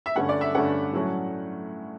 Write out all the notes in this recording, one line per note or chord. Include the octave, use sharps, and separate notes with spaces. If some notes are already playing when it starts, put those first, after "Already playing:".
E5
G2 D3 A3 C#4 F#5
D5
E5
G2 D3 A3 C#4 F#5
A2 F#3 A3 C#4